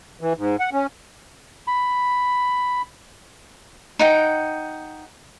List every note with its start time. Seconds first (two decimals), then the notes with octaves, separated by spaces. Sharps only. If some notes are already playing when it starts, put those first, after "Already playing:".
0.21 E3
0.37 G#2
0.60 F#5
0.73 C#4
1.67 B5
3.99 D#4 F#5 G5